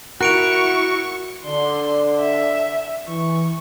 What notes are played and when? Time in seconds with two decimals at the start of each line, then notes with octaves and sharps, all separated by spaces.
0.21 E4 F#4 A#4 C#6 F#6 D7 F7
1.46 D3 D5 C6
2.20 E5
3.07 E3 C#6